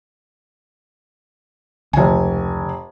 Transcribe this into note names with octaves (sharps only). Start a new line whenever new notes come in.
F1 C#2 G#5